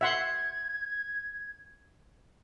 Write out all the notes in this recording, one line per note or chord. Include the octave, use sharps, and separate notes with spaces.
E5 F#5 C6 G#6